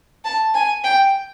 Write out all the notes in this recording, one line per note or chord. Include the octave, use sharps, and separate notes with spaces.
A5
G#5
G5